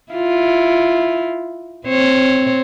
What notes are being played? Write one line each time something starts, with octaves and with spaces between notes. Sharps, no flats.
E4 F4
C4 C5 C#5